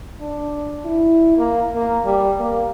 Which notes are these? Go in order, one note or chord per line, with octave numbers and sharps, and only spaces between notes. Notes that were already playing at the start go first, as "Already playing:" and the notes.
D4
E4
A#3
A#3
G3
A#3